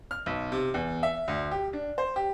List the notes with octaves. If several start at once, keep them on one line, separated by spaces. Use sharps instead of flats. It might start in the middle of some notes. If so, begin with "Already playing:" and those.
F6
B1
C3
E2
E5
D2
G4
D4
C5
G4